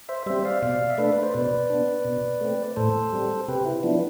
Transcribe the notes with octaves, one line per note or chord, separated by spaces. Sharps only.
C5 E5
G3 C4 C5 E5
D5 F5
B2 D5 F5
E5
A3 D4 B4 D5
B4
C5
B2 B4 D5
B3 D4
B2
A3 C4
A2 A4 C5
G3 C4
C3 G4 B4
E4
F3 B3 D4 E4